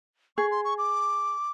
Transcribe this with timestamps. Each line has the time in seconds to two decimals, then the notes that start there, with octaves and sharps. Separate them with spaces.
0.37 G#4 C#6
0.51 C6
0.65 C#6
0.78 D6